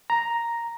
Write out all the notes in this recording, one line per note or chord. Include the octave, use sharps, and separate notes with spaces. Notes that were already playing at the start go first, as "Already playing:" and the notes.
A#5